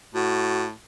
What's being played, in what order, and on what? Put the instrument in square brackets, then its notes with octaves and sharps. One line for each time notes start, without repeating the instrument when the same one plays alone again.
[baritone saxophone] A2 [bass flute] F#4